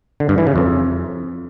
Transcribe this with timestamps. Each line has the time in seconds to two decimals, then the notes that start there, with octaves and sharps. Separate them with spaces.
0.20 D3
0.29 G2
0.38 E3
0.47 C#3
0.56 F2